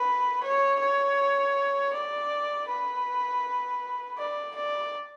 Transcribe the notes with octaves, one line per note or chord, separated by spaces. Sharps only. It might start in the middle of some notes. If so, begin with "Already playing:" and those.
Already playing: B4
C#5
C#5
D5
B4
D5
D5